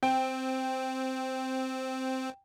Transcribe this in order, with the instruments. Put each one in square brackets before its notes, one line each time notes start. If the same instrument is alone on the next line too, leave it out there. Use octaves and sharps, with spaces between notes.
[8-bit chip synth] C4 [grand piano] G5